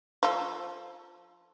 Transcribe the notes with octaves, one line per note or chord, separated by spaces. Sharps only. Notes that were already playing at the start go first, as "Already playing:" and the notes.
F3 A4